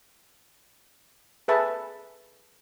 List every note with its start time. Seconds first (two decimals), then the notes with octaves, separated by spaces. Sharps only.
1.48 G#4 A4 B4 E5 A5